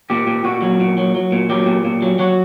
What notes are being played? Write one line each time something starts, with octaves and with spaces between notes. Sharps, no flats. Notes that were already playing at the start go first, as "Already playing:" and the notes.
A#2 G4
A#2
A#2 F#4
F#3
A#2
F#3
F#3
A#2
F#3 G4
A#2
A#2
F#3
F#3 F#4